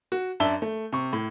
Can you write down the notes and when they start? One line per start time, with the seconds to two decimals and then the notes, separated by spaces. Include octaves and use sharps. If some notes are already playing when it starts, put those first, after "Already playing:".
0.12 F#4
0.40 F#2 D4 E5 A5 G7
0.62 A3
0.92 C3 C#6
1.13 A2